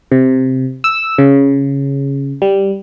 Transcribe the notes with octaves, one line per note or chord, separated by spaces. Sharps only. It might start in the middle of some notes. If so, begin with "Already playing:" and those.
C3
E6
C#3
G3